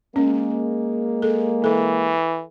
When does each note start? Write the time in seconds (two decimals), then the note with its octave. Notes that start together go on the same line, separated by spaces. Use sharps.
0.16 G#3 A#3 C#4
1.22 A4
1.64 E3 A4